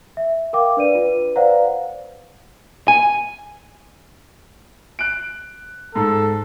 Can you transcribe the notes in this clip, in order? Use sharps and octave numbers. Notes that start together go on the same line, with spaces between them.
E5
A#4 F5 G5 D6
D4 B4 D5 D#7
F4 B4
B4 C5 D5 F5 F#5 A#5
G#5
F#6 D7
G#2 A4